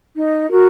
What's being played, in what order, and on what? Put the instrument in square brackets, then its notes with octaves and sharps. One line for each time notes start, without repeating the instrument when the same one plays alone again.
[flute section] D#4
F#4 A#4